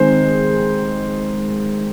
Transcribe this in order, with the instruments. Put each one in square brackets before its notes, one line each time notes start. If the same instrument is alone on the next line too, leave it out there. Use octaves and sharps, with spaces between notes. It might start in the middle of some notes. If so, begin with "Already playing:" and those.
Already playing: [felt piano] D#3 G#3 C4 [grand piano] C5